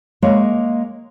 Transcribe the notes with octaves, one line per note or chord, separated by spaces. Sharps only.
G#3 A#3 A#4 C#5